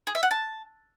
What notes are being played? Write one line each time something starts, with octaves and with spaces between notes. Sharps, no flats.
G#4
E5
F#5
A5